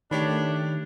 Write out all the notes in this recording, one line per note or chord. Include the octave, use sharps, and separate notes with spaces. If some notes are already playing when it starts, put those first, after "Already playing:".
D#3 A3 D4 G4 C#5 B5